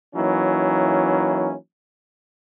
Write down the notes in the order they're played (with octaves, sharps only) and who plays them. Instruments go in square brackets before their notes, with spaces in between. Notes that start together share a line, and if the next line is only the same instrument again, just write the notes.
[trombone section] E3 F#3 A#3 C#4 D#4 E4